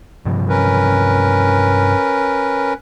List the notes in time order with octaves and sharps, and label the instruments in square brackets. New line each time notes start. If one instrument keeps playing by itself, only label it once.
[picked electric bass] G2 C3 F3
[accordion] C#4 A#4 B4